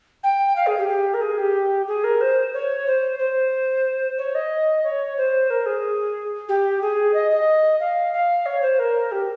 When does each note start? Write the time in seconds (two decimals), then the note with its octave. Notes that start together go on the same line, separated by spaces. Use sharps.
0.23 G5
0.56 F5
0.67 G#4
0.78 G4
0.88 G4
1.14 A#4
1.21 G#4
1.38 G4
1.87 G#4
2.04 A#4
2.21 C5
2.54 C#5
2.87 C5
3.19 C5
4.18 C#5
4.35 D#5
4.84 C#5
5.17 C5
5.50 A#4
5.66 G#4
6.49 G4
6.82 G#4
7.14 D#5
7.31 D#5
7.80 F5
8.13 F5
8.46 C#5
8.62 C5
8.79 A#4
9.12 G4